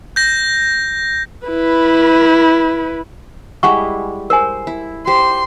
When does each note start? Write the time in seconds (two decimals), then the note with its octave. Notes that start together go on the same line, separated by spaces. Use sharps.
0.16 G6 A#6
1.47 E4 B4
3.63 G3 G#3 E4 F#5 G#5 C#6
4.30 A#4 C5 G#5
4.67 E4
5.07 G4 C5 C6